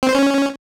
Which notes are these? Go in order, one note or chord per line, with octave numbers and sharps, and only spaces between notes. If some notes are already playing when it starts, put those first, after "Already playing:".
C4
C5
C#4